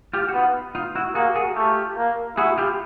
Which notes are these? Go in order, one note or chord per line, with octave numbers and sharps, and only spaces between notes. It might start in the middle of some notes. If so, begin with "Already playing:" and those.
F4 G4
F#4
B3 D#4 F4
D#4 F4
E4 F#4
A#3 F#4 G#4
F#4 G#4
A3 F4 G4
A#3
E4 F#4 G#4
F4 G4